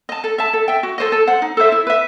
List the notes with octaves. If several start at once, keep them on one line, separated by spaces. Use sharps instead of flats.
D#5 A5
A4
E5 A5
A4
E5 G5
F#4
A4 C5 D#5
A4
C5 F#5
D#4
A4 C5 E5
E4
B4 E5